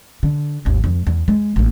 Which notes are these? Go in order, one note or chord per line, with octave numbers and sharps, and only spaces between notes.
D3
G#1 D#2
F2
E2
G#3
A1 A#3